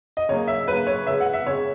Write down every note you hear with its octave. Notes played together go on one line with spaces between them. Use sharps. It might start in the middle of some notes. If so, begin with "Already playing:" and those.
D#5
C#3 F#3 A#3 C#5
E5
C#3 F#3 A#3 B4
C#5
C#3 G#3 B3 E5
F#5
E5
C#3 G#3 B3 C#5